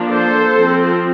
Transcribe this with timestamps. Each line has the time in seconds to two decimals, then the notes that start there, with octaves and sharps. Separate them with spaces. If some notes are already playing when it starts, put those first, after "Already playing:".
Already playing: F3 A#3 D4
0.10 A4 C5
0.56 F3 C4